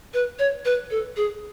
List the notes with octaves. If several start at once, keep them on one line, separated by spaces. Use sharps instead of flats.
B4
C#5
B4
A4
G#4